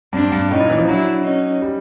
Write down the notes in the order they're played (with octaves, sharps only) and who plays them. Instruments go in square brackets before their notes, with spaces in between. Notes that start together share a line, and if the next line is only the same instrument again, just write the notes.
[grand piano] G2 [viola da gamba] C4 D4
[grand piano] G2
[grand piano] A2 [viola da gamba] C#4 D#4
[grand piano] A#2
E3
F3
[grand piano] F#3 [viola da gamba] D4 E4
[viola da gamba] C#4 D#4
[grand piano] G3